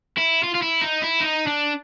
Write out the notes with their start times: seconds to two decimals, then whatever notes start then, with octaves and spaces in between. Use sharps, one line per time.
0.18 E4
0.44 F4
0.55 F4
0.63 E4
0.82 D#4
1.02 E4
1.21 D#4
1.47 D4